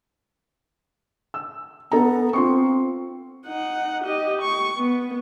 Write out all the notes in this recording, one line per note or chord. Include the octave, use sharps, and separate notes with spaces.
E6
B3 A4 A#5
C4 F4 C6 C#6
D#4 F#5
G4 D#5
C#6
B3